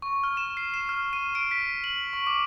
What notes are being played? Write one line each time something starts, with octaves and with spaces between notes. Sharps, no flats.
C#6
F6
E7
C7
E7
F6
D#7
D7
B6
F#7
C#6
D6